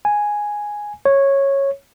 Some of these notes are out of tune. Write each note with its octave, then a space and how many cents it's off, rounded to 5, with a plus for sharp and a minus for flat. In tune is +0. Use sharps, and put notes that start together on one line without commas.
G#5 +0
C#5 -10